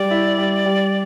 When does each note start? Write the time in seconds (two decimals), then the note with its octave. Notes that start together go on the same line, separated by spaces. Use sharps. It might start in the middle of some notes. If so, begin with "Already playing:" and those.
Already playing: G3 D5
0.11 E4
0.38 G3
0.66 G3